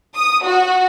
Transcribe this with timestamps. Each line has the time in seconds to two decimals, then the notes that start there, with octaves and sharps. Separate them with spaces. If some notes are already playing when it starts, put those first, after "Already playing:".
0.16 D#6
0.44 F#4